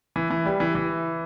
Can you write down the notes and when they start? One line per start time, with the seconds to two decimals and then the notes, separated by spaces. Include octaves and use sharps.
0.16 E3
0.30 E3
0.46 G3
0.60 E3
0.75 E3